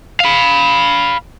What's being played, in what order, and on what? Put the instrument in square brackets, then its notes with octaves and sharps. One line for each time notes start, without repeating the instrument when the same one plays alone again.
[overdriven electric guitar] F5 B5